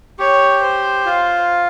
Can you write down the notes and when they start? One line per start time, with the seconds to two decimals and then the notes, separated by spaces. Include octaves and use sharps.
0.19 G4 C#5
0.63 C5
1.06 F4